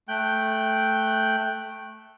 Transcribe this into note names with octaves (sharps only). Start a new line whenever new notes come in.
A3 G5 F#6 G6